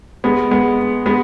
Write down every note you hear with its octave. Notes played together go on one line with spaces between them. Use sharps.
G#3 B3
G#3 B3
G#3 B3